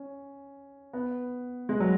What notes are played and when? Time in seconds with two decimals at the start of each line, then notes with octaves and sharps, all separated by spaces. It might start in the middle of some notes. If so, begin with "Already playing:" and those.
Already playing: C#4
0.93 B3
1.69 G#3
1.80 F#3